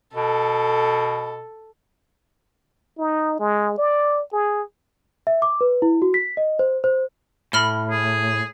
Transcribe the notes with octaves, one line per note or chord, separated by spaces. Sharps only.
B2 A4
D#4
G#3
D5
G#4
E5
D6
B4
E4
F#4
B6
D#5
C5
C5
A2 B5 F6 G7
G#4